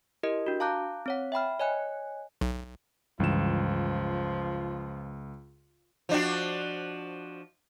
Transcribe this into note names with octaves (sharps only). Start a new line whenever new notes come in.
E4 G4 A#4 D#5
D4 F#4
F5 A5 A#5 D6 F#6 G6
C4 C#5 F#5
E5 G5 B5 F6
C#5 D#5 G#5 F#6
B1
C#2 G2 E3 F3 E7
F3 D4 F#4